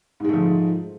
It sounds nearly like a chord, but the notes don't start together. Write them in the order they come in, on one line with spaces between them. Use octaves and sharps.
G#2 G#3 A3 F3